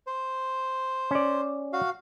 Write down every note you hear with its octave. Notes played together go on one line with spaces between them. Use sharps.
C5
C#4 D5
F#4 F5